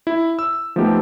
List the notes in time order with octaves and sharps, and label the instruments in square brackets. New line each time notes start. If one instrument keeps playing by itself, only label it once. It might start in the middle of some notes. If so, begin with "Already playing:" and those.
[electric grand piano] E4
E6
F3 A3 B3 D#4 G4